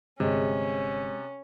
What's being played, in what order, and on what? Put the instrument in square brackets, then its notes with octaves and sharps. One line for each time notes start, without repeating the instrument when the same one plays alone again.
[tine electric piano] G1 [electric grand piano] C3 [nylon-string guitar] G#3 [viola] C#4